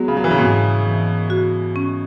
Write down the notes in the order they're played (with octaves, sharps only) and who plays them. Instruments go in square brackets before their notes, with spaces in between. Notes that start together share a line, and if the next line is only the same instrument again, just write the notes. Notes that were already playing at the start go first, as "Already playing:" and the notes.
Already playing: [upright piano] F#3 G#3 [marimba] B3
[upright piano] C#3
F#3
E3
C#3
[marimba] G#2 [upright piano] B2
[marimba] E3
F#4
C#4